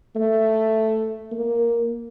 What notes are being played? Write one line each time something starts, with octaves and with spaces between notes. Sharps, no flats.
A3
A#3